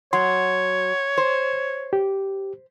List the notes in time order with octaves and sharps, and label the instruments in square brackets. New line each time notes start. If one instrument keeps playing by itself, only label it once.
[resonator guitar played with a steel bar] F#3 [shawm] C#5 [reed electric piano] C6
[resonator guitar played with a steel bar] C5
[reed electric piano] G4